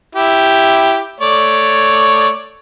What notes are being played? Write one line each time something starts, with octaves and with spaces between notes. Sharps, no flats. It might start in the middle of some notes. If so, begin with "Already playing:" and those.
E4 G4
A3 C#5 D5